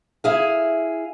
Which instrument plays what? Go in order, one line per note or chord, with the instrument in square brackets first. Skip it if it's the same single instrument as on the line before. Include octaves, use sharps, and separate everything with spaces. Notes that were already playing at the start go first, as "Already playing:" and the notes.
[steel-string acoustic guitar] E4 G#4 F5